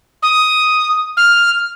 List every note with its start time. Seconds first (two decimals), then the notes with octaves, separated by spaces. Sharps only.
0.23 D#6
1.17 F6